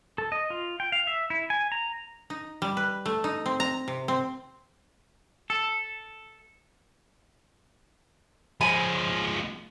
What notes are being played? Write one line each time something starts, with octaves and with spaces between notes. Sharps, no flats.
A4
D#5
F4
G5
F5
E5
E4
G#5
A#5
D#4
G3
B4
A3
D#4
C4
A#5
C3
C4
A4
F3 G#3 G#5 B5